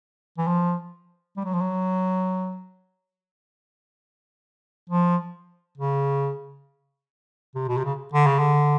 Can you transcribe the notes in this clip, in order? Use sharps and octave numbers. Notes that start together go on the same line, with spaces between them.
E3
F3
G3
F#3
F3
F#3
F3
C#3
C3
B2
C3
C#3
D3
C#3
D3